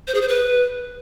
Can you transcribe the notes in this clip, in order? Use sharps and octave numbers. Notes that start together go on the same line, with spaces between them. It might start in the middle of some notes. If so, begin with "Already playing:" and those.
C5
G#4
C5
B4